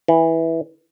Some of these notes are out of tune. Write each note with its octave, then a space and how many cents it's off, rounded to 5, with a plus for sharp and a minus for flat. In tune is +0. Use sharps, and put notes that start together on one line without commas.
E3 -10